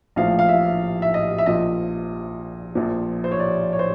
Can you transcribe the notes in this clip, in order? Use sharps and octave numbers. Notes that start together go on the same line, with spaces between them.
A#1 A2 F3 F5
F5
E5
E5
D#5
E5
A#1 A#2 F3 D#5
A#1 A#2 F3
C5
C#5
D5
C#5
C5